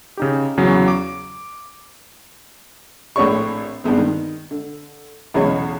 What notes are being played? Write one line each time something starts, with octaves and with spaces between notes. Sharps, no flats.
C#3 D#4 G4
E2 C#3 F#3
D6
A#1 A2 C4 C#5 D5 C#6
G2 G#3 B3 C4
D#3
D3
B1 E2 C#3 C#5 D#5